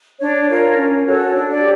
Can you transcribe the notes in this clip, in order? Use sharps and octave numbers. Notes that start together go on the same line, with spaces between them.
D4 C#5
F4 A#4 C#5
C#4
F#4 A4 C#5
D4
D5
G4